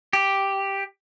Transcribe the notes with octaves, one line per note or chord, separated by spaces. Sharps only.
G4